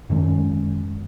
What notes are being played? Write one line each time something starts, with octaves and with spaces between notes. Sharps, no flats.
F#2 D#3 G#3 C#4